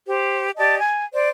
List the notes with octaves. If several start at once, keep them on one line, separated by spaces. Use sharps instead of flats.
G4 C5
G4 D5 D#5 A5
G#5
C5 D5